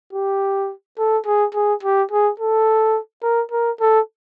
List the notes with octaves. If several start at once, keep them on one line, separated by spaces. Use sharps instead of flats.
G4
A4
G#4
G#4
G4
G#4
A4
A#4
A#4
A4